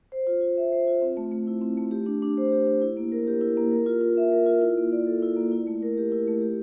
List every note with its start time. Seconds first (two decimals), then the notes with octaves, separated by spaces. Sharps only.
0.12 C5
0.27 F4
0.41 F4
0.57 E5
0.72 C5
0.87 F4
1.02 C4
1.17 A3
1.32 A3
1.47 E4
1.62 C4
1.77 A3
1.91 G4
2.06 D4
2.22 D4
2.37 C5
2.52 G4
2.67 D4
2.82 E4
2.97 A#3
3.12 A#4
3.27 G4
3.41 E4
3.57 A#3
3.71 A#4
3.86 F4
4.01 F4
4.17 E5
4.32 A#4
4.46 F4
4.62 E4
4.78 A#3
4.92 D5
5.07 A4
5.23 E4
5.37 A#3
5.52 E4
5.67 A3
5.82 A#4
5.98 G4
6.12 E4
6.28 A3
6.42 G4